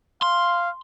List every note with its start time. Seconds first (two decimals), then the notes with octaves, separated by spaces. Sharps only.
0.22 F5 C6